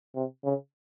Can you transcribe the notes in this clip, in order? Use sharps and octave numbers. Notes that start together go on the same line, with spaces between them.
C3
C#3